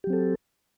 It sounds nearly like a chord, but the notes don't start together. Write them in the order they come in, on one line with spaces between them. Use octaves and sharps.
G4 F#3 C4 A4